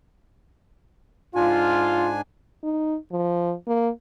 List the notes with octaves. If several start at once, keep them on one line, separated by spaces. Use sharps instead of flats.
G#2 D4 F4 G#5
D#4
F3
A#3